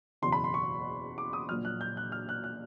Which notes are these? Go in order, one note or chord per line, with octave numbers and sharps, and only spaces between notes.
F#1 E2 B2 C6
B5
C6
C#6
D6
D#6
A#1 A#2 F#3 F6
F#6
G6
F#6
F6
F#6
F#6